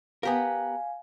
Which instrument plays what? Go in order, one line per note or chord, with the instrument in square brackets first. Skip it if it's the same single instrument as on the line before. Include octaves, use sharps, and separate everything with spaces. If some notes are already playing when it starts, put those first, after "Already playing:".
[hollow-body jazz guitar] B3 G4 A#4 [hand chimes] F5 G#5